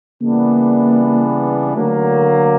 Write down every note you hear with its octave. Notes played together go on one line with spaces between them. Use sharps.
C#3 E3 G3 A#3 B3 D4
D3 F#3 A3 A#3